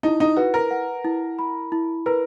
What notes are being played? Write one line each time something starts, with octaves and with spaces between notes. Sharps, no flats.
D#4 E4
D#4
F#4 B4
A#4
F#5
E4
B5
E4
A#4 B4